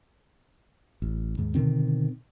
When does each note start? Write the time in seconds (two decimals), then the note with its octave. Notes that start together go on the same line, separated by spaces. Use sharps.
1.02 A1
1.38 D#2 G#2
1.55 B2 D3 D#3 C4